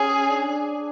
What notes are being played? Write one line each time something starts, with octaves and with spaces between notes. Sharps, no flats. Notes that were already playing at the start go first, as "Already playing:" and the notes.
Already playing: C#4 G#4
D4